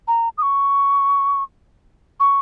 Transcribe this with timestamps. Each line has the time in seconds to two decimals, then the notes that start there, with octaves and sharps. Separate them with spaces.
0.08 A#5
0.38 D#6
0.42 C#6
2.20 C#6